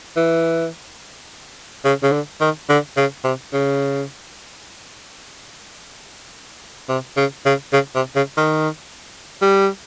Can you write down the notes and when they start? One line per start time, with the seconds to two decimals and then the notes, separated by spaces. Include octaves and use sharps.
0.16 E3
1.85 C#3
2.03 C#3
2.12 D3
2.41 D#3
2.69 D3
2.97 C#3
3.24 C3
3.53 C#3
6.89 C3
7.17 C#3
7.46 C#3
7.73 C#3
7.95 C3
8.15 C#3
8.37 D#3
9.42 G3